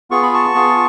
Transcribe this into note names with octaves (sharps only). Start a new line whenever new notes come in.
B3 F4 G#4 C#6
B5
A5 C#6
B3 F4 G#4